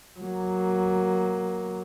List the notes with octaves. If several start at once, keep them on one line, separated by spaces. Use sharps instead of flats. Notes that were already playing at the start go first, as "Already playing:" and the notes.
F#3 A#3